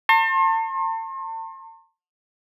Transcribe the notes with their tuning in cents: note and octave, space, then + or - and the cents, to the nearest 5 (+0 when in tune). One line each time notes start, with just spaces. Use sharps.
A5 +40 C6 +40